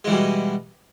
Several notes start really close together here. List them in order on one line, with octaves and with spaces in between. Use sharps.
G#3 E3 G3 B2